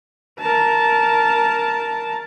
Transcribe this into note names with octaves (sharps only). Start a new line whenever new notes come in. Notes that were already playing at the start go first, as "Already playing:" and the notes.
A#4 A5